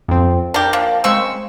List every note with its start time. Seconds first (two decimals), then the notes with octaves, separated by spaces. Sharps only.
0.08 F2 C4
0.54 D4 G4 A#4
0.73 F3 A#3 D4
1.04 C#3 G#3 C4 C#6 E6